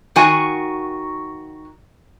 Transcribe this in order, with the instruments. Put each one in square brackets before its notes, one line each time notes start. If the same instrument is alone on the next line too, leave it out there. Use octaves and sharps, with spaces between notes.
[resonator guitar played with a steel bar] D#3 F#4 G#5